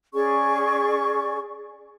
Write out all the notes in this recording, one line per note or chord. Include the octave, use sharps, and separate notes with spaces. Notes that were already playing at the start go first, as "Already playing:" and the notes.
C#4 G#4 D5 C#6